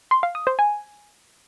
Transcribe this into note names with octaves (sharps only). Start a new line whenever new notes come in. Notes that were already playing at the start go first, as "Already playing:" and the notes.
C6
F5
D#6
C5
G#5